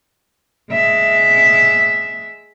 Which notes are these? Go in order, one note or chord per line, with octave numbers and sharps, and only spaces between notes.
G#3 E5